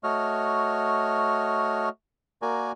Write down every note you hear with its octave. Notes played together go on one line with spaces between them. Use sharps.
A3 F#4 C#5 D#5 F6
A#3 F#4 A#4 D5 G#5